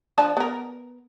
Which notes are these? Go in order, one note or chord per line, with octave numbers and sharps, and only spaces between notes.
F3 D4 A5
B3 A#4